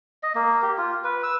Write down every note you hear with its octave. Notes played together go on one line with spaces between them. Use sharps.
D#5
A#3
G4
F4
B4
E6